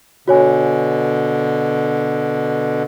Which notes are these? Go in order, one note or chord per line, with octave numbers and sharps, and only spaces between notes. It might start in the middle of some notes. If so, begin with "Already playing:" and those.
B2 D3 F#4 C#5 G#5